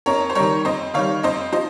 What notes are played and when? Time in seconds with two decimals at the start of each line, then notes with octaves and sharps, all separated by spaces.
0.06 F2 A#4 C#5
0.30 C5
0.35 D#3 G3 A#4 C#5
0.65 F2 C5 D#5
0.94 D#3 G3 C#5 F5
1.23 F2 C5 D#5
1.52 F3 C5 D#5